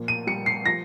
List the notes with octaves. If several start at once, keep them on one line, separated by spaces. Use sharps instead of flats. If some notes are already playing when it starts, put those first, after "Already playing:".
Already playing: A#2 F3
D#7
G3 C#7
C7
F3 A#6